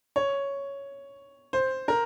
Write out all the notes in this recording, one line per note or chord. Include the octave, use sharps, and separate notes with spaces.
C#5
C5
A#4